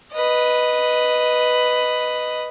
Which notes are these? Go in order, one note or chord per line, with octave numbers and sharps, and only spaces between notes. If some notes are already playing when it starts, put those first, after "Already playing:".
B4 D#5